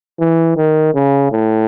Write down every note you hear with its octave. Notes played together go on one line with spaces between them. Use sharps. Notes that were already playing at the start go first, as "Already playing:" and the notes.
E3
D#3
C#3
A2